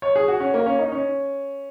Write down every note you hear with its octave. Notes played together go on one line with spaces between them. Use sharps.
C#5
G#4
F#4
C#4
A#3
C#4
D#4
C#4